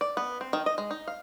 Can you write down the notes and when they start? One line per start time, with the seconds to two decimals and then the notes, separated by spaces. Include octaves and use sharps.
0.01 D5
0.17 B3
0.41 C4
0.53 D#3
0.66 D#5
0.78 G#3
0.91 D#4
1.08 F5